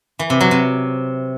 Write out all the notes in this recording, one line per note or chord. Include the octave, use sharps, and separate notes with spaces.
E3
C3
F#3
C3